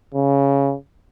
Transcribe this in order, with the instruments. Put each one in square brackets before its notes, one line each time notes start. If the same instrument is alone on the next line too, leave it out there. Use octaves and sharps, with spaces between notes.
[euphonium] C#3